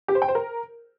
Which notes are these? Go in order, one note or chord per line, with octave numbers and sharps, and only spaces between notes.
G4
C5
G5
C5
A#4